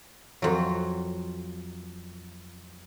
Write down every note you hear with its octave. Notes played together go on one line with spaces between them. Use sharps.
F2 F#3